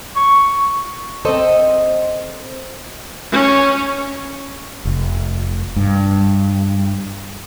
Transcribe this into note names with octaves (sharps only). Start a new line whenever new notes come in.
C#6
C4 A4 C5 D#5
C#4
F1
G2